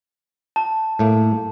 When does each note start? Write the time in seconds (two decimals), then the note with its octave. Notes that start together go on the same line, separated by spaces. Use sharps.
0.56 A5
0.99 A2 A3 A#3